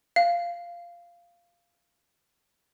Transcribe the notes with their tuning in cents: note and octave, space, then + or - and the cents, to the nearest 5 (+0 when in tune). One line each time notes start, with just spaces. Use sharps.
F5 -10